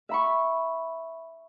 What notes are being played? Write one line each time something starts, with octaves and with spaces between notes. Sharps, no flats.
E5 B5 C#6